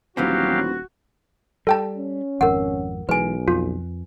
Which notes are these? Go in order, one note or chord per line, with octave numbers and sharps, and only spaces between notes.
D#1 E3 F#3 B3 C4 F#4 G4 F5
G3 A4 G5 A5
C#4
G#1 F2 A#4 F#5
B1 E3 G#3 B4 G#5
F2 F4